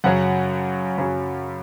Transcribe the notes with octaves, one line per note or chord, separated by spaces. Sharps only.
F#2 C#3 F#3 C#4 F#5
F#2 C#3 F#3 C#4